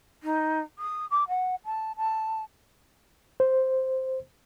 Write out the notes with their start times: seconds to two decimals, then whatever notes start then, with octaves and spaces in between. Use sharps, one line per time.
0.23 D#4
0.78 D#6
1.11 D6
1.28 F#5
1.65 A5
1.97 A5
3.40 C5